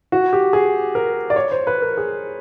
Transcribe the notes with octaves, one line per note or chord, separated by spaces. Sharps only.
F#4
G4
G#4
A#4
D5
C#5
C5
B4
A#4
G#4